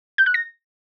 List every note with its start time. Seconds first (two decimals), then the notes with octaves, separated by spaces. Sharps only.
0.18 G6
0.26 F#6
0.34 A#6